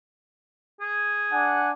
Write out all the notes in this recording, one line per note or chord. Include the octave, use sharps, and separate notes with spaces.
G#4
D4 F#5 G#5